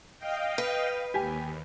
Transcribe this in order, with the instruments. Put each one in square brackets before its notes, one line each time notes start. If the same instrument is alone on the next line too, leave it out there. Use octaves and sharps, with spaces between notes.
[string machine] D#5 F5 G5
[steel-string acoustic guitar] B4
[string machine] D#2 [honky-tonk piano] G4 G#5